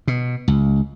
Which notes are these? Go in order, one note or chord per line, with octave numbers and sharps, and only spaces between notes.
B2
C#2